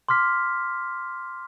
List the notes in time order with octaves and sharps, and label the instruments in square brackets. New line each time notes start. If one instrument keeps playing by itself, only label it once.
[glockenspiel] C6 D6 F6 B6